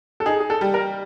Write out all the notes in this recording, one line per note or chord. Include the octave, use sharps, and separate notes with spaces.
A4
D#4 G#4
G#4
A4
G3
A#4